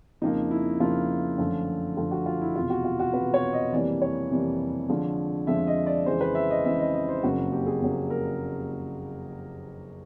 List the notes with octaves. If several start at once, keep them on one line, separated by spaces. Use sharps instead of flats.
F2 C#3 F3 A#3 D#4
E4
F2 C#3 F3 A#3 F4
F#2 D3 F3 A3
F#2 D3 F3 A3 F4
F#4
F4
E4
E1 E2 C3 F4
F#4
F4
F#4
E1 E2 C3 B4
C#5
D#5
F2 C3 E3 G3 A#3 D5
C#5
F2 C3 E3 G3 A#3
F2 D3 F3 G#3
F2 D3 F3 G#3 E5
D#5
D5
F2 C#3 E3 G#3 C5
B4
E5
D#5
F2 C#3 E3 G#3 E5
D#5
D#5
C5
F#1 F2 C#3 F#3 A#3 F#4
G4
G#4
F#1 F2 C#3 F#3 A#3
A#4